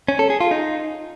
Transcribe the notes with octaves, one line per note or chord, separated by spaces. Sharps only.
C#4
A4
G#4
F4
D#4